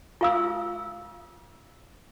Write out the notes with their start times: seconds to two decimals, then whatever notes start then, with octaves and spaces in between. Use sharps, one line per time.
0.21 F4 F5 E6